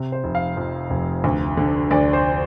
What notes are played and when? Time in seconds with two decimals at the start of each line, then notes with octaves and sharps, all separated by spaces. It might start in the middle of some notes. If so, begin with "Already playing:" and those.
Already playing: C3
0.12 C5
0.24 F1
0.35 F5
0.57 F2
0.90 F1
1.24 D2
1.57 D3
1.91 D2 D5
2.13 C5